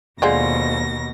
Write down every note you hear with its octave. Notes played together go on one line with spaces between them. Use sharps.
D#2 B2 D3 F3 G#3 A#6